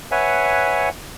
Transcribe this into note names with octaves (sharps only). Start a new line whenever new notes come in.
B4 C#5 E5 F#5 G#5